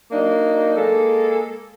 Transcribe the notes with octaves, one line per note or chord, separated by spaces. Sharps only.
F#3 A#3 D4 D#4
G#3 A#3 A4